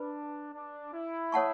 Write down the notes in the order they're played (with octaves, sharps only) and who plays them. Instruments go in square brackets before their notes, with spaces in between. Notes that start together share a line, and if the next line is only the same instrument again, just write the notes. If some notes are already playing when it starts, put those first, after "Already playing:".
Already playing: [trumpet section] D4 [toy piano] B4 B5
[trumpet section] D4
E4
[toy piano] A4 C#5 F#5 A5 C#6